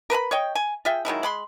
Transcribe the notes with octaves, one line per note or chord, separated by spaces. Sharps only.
A#4 B4 A5 B5
C#5 D#5 G5
G#5
F4 G#4 E5 G5
D#3 F#3 G#3 E4
G#3 B5 C6